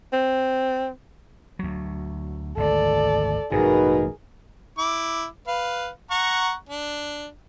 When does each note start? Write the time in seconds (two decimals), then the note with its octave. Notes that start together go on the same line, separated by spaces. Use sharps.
0.13 C4
1.59 D2 F#3
2.57 G#1 D2 A4 D5
3.52 A1 G2 B2 D#4 F#4 G#4 A#4 B4
4.78 E4 D6
5.47 B4 F5
6.11 F#5 A#5 C#6
6.69 D4